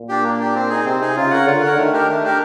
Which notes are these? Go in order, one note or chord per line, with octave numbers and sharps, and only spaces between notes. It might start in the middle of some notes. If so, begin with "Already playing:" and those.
Already playing: A#2
D4 G4
A#3
D4 G4
C4
D#4 G#4
C3 C4
D#4 G#4
C#3 F4
A#4 C#5 F#5
D3 F4
A#4 C#5 F#5
D#3 A3
D4 G4 A#4
A3
D4 G4 A#4